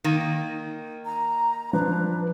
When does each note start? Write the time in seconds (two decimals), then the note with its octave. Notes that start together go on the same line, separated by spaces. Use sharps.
0.04 D#3 A#3
1.05 A#5
1.73 F3 D4 B4